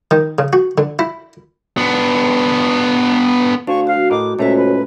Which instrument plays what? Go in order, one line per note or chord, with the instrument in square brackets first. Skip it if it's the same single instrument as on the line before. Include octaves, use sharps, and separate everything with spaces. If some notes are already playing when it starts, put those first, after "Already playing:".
[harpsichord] D#3
C#3
F#4
D3
E4
[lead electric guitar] B3 D4
[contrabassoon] D2 [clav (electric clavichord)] D4 C5 G#5 [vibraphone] F5 [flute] C#6
[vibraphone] F#4 [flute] F5
[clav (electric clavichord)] A2 A#4 D#5 [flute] D6
[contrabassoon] C#2 [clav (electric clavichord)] A#2 A3 A#5 [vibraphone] F#4 C5 C#5 [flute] E5
[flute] B4